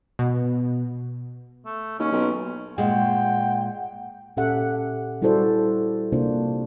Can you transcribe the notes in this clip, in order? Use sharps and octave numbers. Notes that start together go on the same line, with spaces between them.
B2
A3
D#2 C#4
B1
A#2 G#3 F#5 G5
A#2 C#4 G4 A4 E5 F#5
G3 E4 F#4 A4 C5 D5
C3 A#3 D4 F4 C5